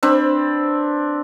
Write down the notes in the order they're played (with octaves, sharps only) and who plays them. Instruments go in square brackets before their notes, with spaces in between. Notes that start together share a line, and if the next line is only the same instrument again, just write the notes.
[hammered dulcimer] C4 D4 B4 B5